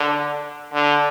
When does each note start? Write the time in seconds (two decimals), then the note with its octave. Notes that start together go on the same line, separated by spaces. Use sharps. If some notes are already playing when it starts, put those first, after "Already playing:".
Already playing: D3
0.73 D3